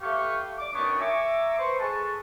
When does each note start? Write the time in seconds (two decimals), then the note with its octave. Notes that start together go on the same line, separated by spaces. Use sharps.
0.01 A3 G4 B4 F5 C#6
0.58 D6
0.74 F#2 D#3 B3 D4 C#6
0.99 E5 G#5 A#5 C#6 D6 E6
1.58 B4 C5 C6 C#6
1.79 G#4 A4 B4 A5 C#6